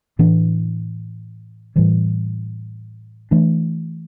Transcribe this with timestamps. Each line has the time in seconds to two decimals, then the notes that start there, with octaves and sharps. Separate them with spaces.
0.19 A2 E3 B3 D4
1.76 A2 E3 G3
3.31 E3 A3 D4